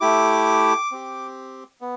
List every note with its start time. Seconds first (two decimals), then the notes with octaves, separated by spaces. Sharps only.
0.01 A3 E4 G4 D6
0.92 C4 G4
1.81 B3